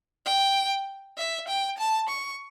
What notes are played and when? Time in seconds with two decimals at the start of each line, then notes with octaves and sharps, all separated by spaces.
0.26 G5
1.18 E5
1.48 G5
1.78 A5
2.09 C#6